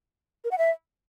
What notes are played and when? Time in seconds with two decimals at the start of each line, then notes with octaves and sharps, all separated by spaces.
0.44 A#4
0.51 F#5
0.58 E5